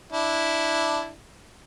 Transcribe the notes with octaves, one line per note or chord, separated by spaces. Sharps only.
D4 E4